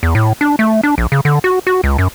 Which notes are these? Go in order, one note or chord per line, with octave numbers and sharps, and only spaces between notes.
E2
A2
D4
A3
D4
A#1
C#3
D3
F#4
F#4
C#2
F#2